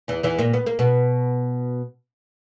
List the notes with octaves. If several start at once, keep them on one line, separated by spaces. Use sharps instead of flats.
E2 E3
E2 E3
A#2 A#3
B3
A#3
B2 B3